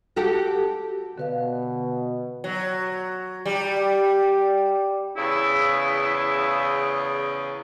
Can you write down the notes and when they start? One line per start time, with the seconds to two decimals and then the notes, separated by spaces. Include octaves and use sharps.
0.16 F#4 G4 A4
1.18 B2 D3 B4 F5
2.44 F#3
3.46 G3
5.17 E2 C#3 E4